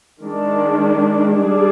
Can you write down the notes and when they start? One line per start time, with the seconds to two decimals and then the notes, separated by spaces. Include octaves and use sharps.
0.21 D#3 G#3 D4
1.37 G3 D4 G#4 D5